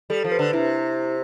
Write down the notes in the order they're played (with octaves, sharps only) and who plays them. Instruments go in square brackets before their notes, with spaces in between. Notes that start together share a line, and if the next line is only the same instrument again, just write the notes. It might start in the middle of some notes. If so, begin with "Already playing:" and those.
[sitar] G3 [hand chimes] A4
[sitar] F3
[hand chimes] B4
[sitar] D3
[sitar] C3 [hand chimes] E4